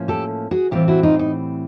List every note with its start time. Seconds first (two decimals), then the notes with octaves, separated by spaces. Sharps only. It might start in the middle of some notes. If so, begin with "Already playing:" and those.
Already playing: A2 F3 A#3 C#4
0.08 G4 A4
0.51 F#4 G#4
0.71 A2 E3 G3 C4 F4 G4
0.88 E4 F#4
1.03 D#4 F4
1.19 D#4